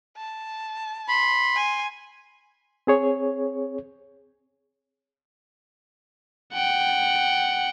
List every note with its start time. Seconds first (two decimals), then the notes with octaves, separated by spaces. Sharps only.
0.17 A5
1.08 B5 C6
1.56 G#5
2.87 C4 G#4 C#5
6.54 F#5 G5